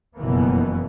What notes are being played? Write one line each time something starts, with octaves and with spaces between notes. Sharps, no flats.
F#1 F2 B2 E3 A#3 B3